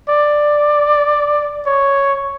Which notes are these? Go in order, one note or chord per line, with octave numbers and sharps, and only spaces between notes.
D5
C#5